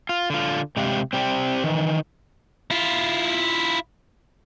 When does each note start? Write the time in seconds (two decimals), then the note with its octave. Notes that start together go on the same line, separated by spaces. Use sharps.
0.09 F4
0.30 D3 F4
0.77 C3 G#3 G4 F5
1.13 C4 G4 D5
1.63 D#3 E3
2.71 E4 F4